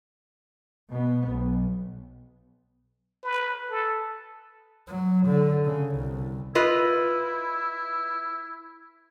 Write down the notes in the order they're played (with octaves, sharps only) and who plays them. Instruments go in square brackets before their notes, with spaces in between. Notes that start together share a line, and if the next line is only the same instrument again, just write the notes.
[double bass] B2 B3
B1
[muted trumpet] B4
A4
[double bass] F#3
D3
C#3
C2
[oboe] E4 [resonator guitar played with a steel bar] F4 B4 D#5